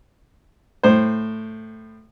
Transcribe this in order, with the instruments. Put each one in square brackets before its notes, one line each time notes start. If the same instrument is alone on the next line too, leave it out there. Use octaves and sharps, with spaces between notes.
[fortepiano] A2 C5